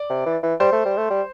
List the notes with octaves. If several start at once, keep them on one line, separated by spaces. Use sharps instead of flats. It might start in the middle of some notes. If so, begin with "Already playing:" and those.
Already playing: D5
C3
E3
E3
G3 C5
A3
G3
A3
G3